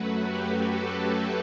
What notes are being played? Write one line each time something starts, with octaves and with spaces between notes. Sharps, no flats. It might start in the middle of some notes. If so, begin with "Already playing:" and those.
Already playing: F#2 F#3 A3 F#4 B4
G4
A4